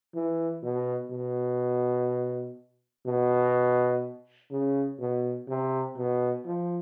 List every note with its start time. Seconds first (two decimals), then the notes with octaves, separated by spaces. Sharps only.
0.15 E3
0.63 B2
1.11 B2
3.06 B2
4.51 C#3
5.00 B2
5.48 C3
5.97 B2
6.45 F3